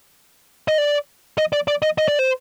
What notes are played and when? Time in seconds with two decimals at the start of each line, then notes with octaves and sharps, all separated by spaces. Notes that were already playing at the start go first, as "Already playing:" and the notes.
0.68 D#5
0.78 D5
1.38 D#5
1.53 D5
1.68 D5
1.82 D#5
1.98 D#5
2.08 D5
2.19 C5